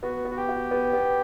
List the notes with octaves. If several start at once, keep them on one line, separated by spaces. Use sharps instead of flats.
B3 F#4
B3
F#4
G4
F#4
B3
B3